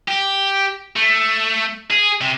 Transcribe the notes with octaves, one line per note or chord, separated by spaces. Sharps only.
G4
A3
G#4
C3